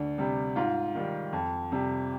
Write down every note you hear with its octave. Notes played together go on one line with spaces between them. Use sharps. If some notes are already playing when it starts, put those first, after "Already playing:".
Already playing: D2 D4
C3 G3
G#2 F4
D#3 G3
F2
C3 G3